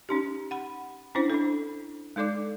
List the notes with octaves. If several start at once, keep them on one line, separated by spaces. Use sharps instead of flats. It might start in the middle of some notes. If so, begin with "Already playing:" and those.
C#4 D#4 G4
F#5 B5
C#4 D4 E4 C5
D4 A4
G#3 D#4 A4 D5 D6